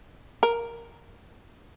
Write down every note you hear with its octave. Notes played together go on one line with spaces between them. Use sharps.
A#4